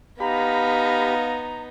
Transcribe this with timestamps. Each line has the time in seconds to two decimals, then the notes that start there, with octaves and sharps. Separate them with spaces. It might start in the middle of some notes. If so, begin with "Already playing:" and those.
0.20 B3 D#4 G4 F5 A#5 B5